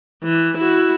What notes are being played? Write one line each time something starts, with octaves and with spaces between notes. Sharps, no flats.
E3
E4 F#4